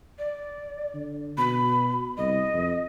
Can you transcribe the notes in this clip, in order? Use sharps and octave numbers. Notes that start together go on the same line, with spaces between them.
D5
D3
B2 B5
C2 D#5
F2